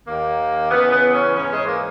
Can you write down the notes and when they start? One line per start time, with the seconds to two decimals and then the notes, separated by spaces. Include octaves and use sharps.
0.06 D#2 D#3 A#3
0.70 E2 C#3 E3 B3
0.92 B3
1.13 C#4
1.35 G#2 E3 C#4
1.51 G#3
1.67 A#3